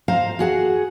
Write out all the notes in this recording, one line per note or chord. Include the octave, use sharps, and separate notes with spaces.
C5 F5 A#5
F#4 G#4 F#5